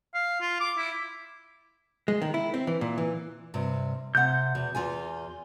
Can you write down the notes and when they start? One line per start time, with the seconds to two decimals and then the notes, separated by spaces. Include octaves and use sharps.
0.14 F5
0.41 F4
0.60 D6
0.78 E4
2.08 G#3
2.22 D#3
2.34 E4
2.54 C4
2.67 E3
2.81 A#2
2.98 E3
3.54 G2 C3
4.15 C3 F#5 G6
4.55 E2 B2
4.75 E2 F4 G#5